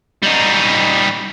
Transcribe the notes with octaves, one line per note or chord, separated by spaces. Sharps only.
G3 D#4